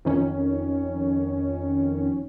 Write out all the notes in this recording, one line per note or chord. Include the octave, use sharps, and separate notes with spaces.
F2 D#3 C#4